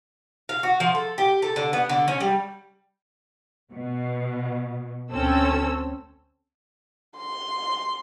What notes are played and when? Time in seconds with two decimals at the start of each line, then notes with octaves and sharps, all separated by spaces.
0.49 F5
0.63 F#4
0.80 F3
0.95 A4
1.18 G4
1.42 A4
1.56 D3
1.73 B3
1.89 D3
2.08 C#4
2.20 G3
3.71 B2
5.11 D2 C4 C#4 A4 E6
7.18 C6